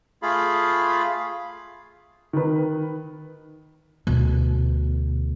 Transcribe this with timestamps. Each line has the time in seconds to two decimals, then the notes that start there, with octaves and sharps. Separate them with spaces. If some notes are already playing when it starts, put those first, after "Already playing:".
0.22 A3 F4 G#4 F5 B5
2.33 D#3 B4
4.07 D2 B2